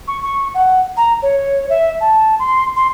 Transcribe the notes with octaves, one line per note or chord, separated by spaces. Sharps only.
C#6
C#6
F#5
A#5
C#5
E5
A5
C6
C6